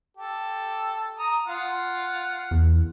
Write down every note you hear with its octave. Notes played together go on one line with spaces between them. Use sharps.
G4 A4
A#5 D#6
F4 F5 F#5
E2